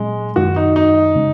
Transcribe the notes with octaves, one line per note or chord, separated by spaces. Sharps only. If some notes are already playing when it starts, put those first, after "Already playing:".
Already playing: A#2 F#3 G#3 C#4
F#2 D#3 G#3 F#4
D#4
D#4
C#3 G#3 C#4